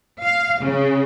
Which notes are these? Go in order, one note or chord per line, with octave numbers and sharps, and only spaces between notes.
F5
C#3